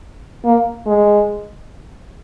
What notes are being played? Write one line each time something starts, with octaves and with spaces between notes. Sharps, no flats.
A#3
G#3